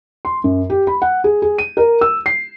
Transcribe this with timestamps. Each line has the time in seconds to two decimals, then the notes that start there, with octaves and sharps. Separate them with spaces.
0.25 C6
0.44 F#2
0.70 G4
0.87 B5
1.02 F#5
1.24 G#4
1.42 G#4
1.58 D#7
1.77 A#4
2.01 E6
2.26 C7